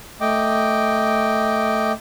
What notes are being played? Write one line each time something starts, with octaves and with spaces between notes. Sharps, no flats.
A3 D#5 G5 D6